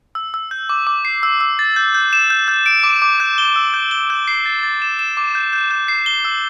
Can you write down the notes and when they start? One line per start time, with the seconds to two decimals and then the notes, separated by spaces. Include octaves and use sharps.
0.15 E6
0.34 E6
0.51 G6
0.69 D6
0.87 D6
1.05 C7
1.23 E6
1.40 E6
1.59 A6
1.76 G6
1.95 G6
2.13 E7
2.30 G6
2.48 G6
2.66 D7
2.83 D6
3.02 D6
3.20 G6
3.38 G7
3.56 E6
3.74 G6
3.91 G7
4.10 G6
4.28 C7
4.46 A6
4.63 A6
4.82 E7
4.99 E7
5.17 D6
5.35 G6
5.53 G6
5.71 G6
5.88 C7
6.06 G7
6.25 E6